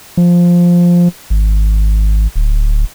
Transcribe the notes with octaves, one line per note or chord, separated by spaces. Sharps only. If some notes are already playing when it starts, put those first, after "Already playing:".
F3
G#1
D1